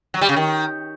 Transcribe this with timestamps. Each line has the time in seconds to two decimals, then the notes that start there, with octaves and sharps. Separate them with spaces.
0.14 F#3
0.21 G3
0.29 C#3
0.36 D#3